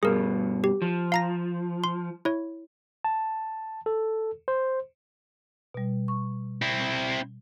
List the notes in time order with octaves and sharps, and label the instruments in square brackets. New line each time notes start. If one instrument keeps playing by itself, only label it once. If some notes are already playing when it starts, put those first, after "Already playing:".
[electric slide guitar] G2 B2 [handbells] G#4 A#4
[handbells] G4
[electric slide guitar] F3
[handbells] F5 A#5 A#6
C6
E4 C#5
[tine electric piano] A5
A4
C5
[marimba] B2 G3
C#6
[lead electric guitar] C4 E4